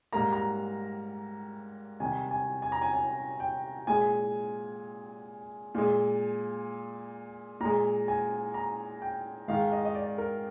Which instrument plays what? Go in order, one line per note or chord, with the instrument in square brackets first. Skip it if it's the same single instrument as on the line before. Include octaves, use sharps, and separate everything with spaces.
[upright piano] G#2 G3 A#3 A#5
A#5
C3 D#3 G3 G#5
G#5
G#5
A#5
G#5
G#5
G5
A#2 G#3 G#5
A#2 G#3
A#2 G#3 A#5
G#5
A#5
G5
G#2 D#3 G#3 F5
D#5
D#5
D5
A#4